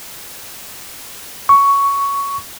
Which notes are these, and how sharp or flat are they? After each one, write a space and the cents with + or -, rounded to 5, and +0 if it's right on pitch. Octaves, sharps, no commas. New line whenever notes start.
C#6 +10